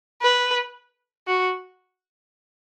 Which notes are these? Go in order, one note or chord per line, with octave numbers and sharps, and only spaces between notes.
B4
F#4